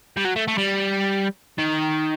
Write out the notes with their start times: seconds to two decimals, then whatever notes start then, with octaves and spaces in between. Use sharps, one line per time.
0.17 G3
0.25 F#3
0.36 A3
0.48 A3
0.58 G3
1.58 D#3